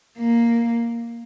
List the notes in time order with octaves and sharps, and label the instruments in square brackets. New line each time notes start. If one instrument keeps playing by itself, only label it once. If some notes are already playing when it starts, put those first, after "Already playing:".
[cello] A#3